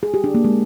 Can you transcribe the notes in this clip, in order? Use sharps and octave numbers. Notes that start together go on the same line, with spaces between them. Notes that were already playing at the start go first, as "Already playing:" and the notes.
G#4
G4
D4
A#3
G#3